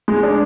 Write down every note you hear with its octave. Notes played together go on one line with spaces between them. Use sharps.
G#3
D4